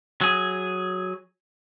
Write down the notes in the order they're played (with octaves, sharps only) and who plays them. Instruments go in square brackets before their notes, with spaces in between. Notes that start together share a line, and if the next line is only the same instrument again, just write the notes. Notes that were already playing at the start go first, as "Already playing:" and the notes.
[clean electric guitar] F#3 G#4